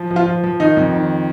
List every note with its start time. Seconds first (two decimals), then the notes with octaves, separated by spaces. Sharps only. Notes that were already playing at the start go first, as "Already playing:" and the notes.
Already playing: F3
0.11 F3
0.16 F4
0.26 F3
0.44 F3
0.60 D#3 D#4
0.77 F2
0.93 D#3